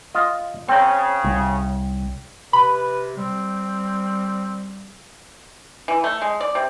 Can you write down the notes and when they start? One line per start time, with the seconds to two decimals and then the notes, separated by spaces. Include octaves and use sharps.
0.15 F4 D#5
0.69 C#3 C4 C#5 G5 A#5
1.24 C2
2.53 C3 B4 B5
3.17 G3 C4
5.88 E3
6.04 A3
6.22 G#3
6.40 D5
6.55 C3